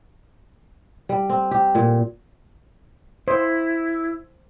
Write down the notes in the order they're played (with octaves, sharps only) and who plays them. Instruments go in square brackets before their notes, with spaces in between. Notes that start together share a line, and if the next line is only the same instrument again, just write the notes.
[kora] G3
C4
G4
A#2
[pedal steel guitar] E4 [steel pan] C5